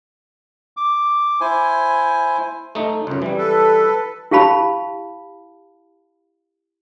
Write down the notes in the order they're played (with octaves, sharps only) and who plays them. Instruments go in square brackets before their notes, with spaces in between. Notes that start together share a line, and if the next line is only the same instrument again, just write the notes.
[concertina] D6
E4 C5 G#5
[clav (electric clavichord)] A3 D#4
C#2 F#2
E3 G3
[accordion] A4 B4
[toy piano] E4 G4 F5 A5 B5